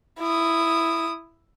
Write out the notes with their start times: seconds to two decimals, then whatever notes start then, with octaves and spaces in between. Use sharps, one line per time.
0.19 E4 D#6